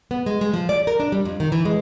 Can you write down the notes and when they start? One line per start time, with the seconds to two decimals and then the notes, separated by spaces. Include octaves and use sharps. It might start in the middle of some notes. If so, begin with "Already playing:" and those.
0.11 B3
0.26 G#3
0.41 G#3
0.53 F3
0.69 D5
0.87 A#4
1.00 D4
1.12 G3
1.25 F2
1.40 D#3
1.52 E3
1.65 G#3